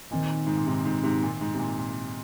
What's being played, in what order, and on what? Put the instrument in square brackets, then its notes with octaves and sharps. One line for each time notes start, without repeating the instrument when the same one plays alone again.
[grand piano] A#2 [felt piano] D#3 C4 D#4
[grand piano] G#2
A#2
G#2 C3
G#2
G#2 C3
A#2
G#2
C3
A#2
A#2